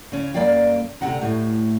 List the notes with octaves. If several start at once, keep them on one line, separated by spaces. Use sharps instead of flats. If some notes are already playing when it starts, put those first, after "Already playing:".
C#3 C#4
F#2 G3 A#3 D5 F5 G5
D2 C3 C4 F#5 A#5
A2 A3